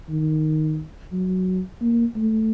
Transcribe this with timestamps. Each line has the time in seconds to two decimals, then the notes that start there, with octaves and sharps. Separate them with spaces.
0.09 D#3
1.13 F#3
1.81 A#3
2.16 A3